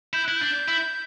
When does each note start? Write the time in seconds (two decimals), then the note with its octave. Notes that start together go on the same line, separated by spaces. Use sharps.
0.13 E4 G6
0.24 E4 F#6
0.36 D4 G6
0.68 E4